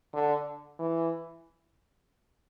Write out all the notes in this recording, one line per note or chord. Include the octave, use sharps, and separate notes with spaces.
D3
E3